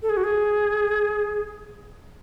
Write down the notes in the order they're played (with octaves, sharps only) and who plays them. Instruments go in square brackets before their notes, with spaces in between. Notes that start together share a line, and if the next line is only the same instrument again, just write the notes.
[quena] A4
G#4
F#4
G#4